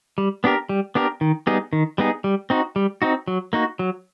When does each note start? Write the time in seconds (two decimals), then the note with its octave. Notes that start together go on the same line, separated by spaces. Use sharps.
0.18 G3
0.44 B3 D4 G4 A#4
0.69 G3
0.95 B3 D4 G4 A#4
1.21 D#3
1.47 G3 B3 D#4 G#4
1.73 D#3
1.98 G3 B3 D#4 G#4
2.24 G3
2.50 C4 D#4 F#4
2.76 G3
3.02 C4 D#4 F#4
3.28 F#3
3.53 A#3 D#4 F#4
3.79 F#3